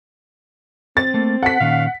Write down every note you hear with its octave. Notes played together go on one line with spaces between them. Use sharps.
C4 A6
A3 A#3
A4 F#5 B6
A#2 D#3 C#4 F5